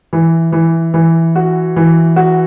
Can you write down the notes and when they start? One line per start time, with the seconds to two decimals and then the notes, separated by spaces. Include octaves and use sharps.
0.13 E3
0.52 E3
0.94 E3
1.36 F#4
1.76 E3
2.16 F#4